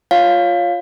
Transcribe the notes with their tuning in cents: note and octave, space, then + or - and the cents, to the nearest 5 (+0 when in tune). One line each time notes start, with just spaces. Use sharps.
F4 +5 C#5 +0 F5 +0